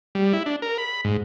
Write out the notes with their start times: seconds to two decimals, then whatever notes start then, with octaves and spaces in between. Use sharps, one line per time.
0.15 G3
0.33 E4
0.46 D4
0.62 A#4
0.78 B5
1.04 G#2